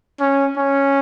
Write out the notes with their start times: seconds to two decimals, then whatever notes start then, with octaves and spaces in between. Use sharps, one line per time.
0.20 C#4
0.57 C#4